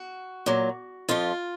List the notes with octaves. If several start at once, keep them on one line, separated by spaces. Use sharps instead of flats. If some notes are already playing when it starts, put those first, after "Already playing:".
Already playing: F#4
A#2 F#3
F2 F3 F4